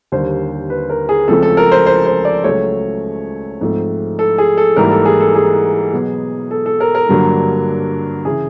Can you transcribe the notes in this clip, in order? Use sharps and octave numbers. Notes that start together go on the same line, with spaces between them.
D#2 D3 G3 A#3 C5
B4
A#4
G#4
C#2 C#3 F3 A3 C4 A4
A4
A#4
C5
C5
C5
D5
C#2 C#3 F#3 A3 C#5
G#2 F3 A3 C4
A4
G#4
A4
G#2 E3 G3 A#3 A#4
A4
G#4
A4
G#4
B2 F#3 B3
A4
A4
A#4
A#4
G2 D3 F#3 A#3
C#3 E3 G#4